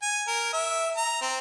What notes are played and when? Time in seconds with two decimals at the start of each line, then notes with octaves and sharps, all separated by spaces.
0.02 G#5
0.27 A#4
0.53 E5
0.97 A#5
1.21 C4